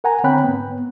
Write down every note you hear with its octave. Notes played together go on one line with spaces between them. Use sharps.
A#4 F#5 G#5 A#5
D3 C4 C#5 G5 B5 F#6
G#2 B3